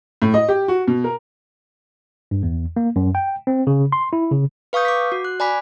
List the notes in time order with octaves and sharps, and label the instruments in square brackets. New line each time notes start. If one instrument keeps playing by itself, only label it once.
[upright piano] A2
D#5
G4
F#4
B2
A#4
[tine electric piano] G2
E2
A#3
F#2
G5
C4
C#3
C6
E4
C#3
[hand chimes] B4 F5 C#6 D#6 G6
D6 B6
F#4
F#6
D5 G#5 B5 D6 B6